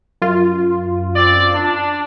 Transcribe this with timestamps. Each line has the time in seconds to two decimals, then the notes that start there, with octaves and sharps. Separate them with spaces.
0.22 F#2 F4
1.15 C4 D5
1.54 D4